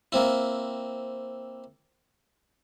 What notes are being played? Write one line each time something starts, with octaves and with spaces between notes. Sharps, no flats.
A#3 C4 E4